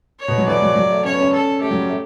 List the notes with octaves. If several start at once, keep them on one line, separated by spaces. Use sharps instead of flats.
C#5
B2
F#3
E3 D5
F#3
F#3
A3
C#4 C#5
B3
C#4
A4
A3 G4
F#3
G3
A3